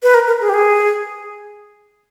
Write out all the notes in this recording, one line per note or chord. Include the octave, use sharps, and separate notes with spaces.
B4
A#4
A#4
G#4
G4
G#4